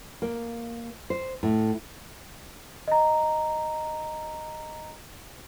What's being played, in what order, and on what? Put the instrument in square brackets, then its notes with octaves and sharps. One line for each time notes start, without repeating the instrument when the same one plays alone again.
[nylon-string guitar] A#3
C5
A2
[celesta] D#5 A#5